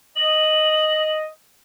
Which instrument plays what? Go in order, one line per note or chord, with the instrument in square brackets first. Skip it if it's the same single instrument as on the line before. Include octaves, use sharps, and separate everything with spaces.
[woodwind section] D#5 [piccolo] F#7